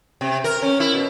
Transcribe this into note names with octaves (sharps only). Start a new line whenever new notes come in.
C3
A#4
C#4
E4
B2